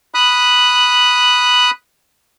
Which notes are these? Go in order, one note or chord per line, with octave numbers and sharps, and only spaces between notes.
B5 D#6 F#6